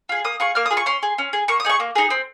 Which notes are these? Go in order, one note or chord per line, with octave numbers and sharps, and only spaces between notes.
F4 G#4
A#3 D#6
F4 G#4 C#6
A#3 F6
D#6
F4 G#4
C#6
C#4 C6
G#4
C#4
G#4
A#3 C#6
D#6
D#4 G#4 C#6
A#3
D#4 G#4
C4